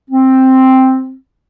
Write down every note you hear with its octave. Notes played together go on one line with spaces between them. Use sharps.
C4